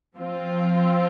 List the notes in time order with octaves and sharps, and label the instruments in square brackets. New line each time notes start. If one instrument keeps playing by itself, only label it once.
[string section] F3 C4 F4